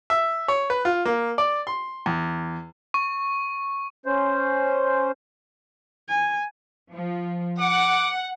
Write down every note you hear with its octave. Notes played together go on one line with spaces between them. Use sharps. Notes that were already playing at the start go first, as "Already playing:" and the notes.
E5
C#5
B4
F4
A#3
D5
C6
E2
C#6
C#4 C5
G#5
F3
F#5 D6